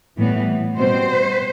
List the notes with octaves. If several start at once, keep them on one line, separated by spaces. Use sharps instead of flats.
A2 E3 G3 B3
B2 G3 C4 C5